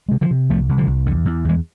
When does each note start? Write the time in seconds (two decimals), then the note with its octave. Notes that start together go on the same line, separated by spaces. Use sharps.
0.08 C3 G#3
0.21 D3 F3
0.31 C3
0.49 C2 F3 A3
0.69 C2
0.78 D3 F3
0.87 C2
1.06 E2 D3
1.25 E2
1.45 E2 E3 G#3